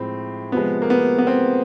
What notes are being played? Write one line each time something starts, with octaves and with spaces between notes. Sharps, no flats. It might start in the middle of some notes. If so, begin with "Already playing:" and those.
Already playing: A2 F3 G#3 C4
C3 F3 G#3 B3
A#3
B3
B3
C4